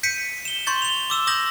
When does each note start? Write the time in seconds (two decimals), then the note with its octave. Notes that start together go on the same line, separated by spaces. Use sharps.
0.03 G6 B6 C#7 D#7
0.45 E7 G7
0.67 C6 C#6 G6 A6
0.82 F7 G7
1.10 D6 E6 E7
1.27 D#6 G6 A#6 F#7